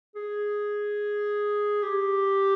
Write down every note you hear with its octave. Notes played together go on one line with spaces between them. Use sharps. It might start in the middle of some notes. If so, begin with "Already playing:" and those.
G#4
G4